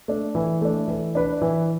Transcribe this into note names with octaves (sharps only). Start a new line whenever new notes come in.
A3 D4
E3
A3 D4
E3
D4 B4 D5
E3